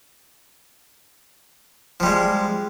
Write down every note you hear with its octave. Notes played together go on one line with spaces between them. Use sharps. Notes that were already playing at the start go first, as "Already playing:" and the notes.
F3 G3 G#3